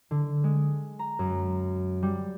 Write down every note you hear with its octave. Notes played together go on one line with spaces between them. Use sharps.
D3
G#3
A#5
F#2
G3